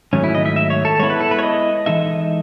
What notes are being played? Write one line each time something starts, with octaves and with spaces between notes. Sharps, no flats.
G#2 D#3 F#3 A3 C#4
E4
D#5
E5
E5
C#5
A4
G#3 B3 E4 C#5
B4
A4
B4
C#5
D#5
E3 G#3 D#4 A4 E5